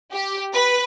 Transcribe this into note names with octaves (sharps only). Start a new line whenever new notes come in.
G4
B4